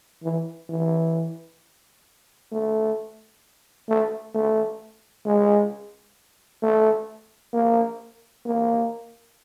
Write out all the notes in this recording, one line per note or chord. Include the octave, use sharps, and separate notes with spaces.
E3
E3
A3
A3
A3
G#3
A3
A#3
A#3